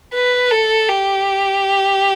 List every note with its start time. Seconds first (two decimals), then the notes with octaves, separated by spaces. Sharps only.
0.15 B4
0.51 A4
0.89 G4